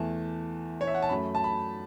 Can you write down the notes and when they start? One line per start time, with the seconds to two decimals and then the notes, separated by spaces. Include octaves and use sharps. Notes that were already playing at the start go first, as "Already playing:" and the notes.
Already playing: E2 E3 A3 A5
0.81 C#5
0.87 E5
0.94 F#5
1.02 A5
1.09 F#2 F#3 A3 B5
1.35 A5
1.44 B5